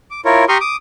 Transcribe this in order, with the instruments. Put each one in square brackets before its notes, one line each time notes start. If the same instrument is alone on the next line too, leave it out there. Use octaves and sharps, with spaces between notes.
[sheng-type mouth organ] D6
E4 F4 A#4 C#5
G4 A#5 C6 C#6 D#6 F6
D6 D#6